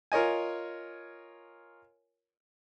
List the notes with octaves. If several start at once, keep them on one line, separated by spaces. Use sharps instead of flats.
F4 A#4 C#5 D#5 G#5